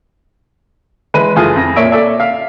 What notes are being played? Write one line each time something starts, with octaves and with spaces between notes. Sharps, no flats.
E3 G#3 B4 D#7
F#1 E3 A3 F4 G#4 D#6
F2 A#6
A#2 A#3 C#5 E5 D7
A4 D5 E5
E5 F5